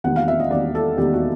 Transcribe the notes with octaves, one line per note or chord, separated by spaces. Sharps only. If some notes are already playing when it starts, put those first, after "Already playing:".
E1 D#2 D#3 F#5
F5
E5
D#5
E1 D#2 D#3 D5
A4
E1 D#2 D#3 G4
F#4